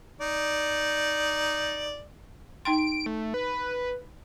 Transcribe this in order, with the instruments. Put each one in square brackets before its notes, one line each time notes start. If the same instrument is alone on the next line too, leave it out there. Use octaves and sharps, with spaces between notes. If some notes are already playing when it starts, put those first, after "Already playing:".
[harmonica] D#4 D5
[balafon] D#4 G5 C6 [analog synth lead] D7
[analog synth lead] A3
B4